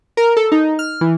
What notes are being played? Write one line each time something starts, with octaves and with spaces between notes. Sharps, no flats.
A#4
A4
D#4
F6
E3